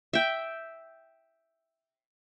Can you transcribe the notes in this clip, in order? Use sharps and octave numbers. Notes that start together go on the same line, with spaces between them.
E5 G5